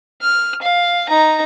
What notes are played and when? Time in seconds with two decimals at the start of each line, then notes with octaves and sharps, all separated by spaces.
0.22 F6
0.62 F5
1.09 D#4 A#5